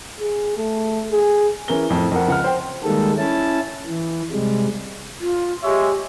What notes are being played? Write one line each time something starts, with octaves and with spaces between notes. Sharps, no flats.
G#4
A3
G#4
E3 C#4 A#4 G7
F2 A2
F2 A#4 F#5
C#2 F#5 F6
C5 G5
D#3 G3 G#3 A#3 A4
C#4 E4 A5
E3
C3 G3 G#3
F4
G#3 G4 C#5 E5